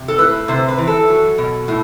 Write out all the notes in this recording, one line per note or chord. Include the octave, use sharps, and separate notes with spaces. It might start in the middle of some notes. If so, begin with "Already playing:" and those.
Already playing: C3
A4
A2 B4
C3 C5
B4
E3
A4
F#3
B2
A2